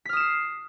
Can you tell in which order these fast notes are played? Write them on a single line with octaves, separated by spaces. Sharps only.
B6 F6 D#6 E7 C7